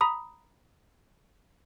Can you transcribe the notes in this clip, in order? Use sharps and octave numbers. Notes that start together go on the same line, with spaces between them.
A#5 B5 D#6